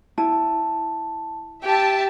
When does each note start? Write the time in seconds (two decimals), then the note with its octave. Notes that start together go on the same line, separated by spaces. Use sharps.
0.18 E4 A5
1.63 G4 E5 A5